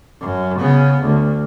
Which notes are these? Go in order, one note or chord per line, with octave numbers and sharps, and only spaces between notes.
F#2
C#3 B3
D2